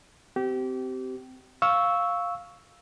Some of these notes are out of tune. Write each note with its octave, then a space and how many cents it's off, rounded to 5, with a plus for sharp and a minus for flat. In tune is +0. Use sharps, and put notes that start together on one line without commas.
C4 -20 G4 -25
F5 +0 C#6 +5 E6 -10